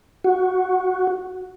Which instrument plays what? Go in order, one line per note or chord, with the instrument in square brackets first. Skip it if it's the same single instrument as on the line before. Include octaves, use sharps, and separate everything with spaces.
[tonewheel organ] F#4